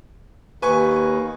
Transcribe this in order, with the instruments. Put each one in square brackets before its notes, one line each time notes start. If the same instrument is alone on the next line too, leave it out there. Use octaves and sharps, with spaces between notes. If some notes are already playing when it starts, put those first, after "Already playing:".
[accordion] D#2 [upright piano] B4 G#5 C#6